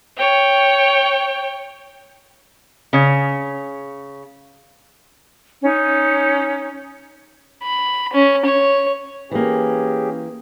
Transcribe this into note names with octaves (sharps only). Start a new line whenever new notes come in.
C#5 G5
C#3 C#5
C#4 D#4
B5
C#4
C#5
E3 A#3 C#4 G4 G#4